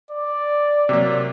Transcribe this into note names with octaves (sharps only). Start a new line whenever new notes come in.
D5
C3 F#3 A#3